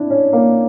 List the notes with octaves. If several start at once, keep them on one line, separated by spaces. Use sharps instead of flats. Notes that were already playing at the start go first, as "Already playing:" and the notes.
Already playing: D4 E4
C#4
A#3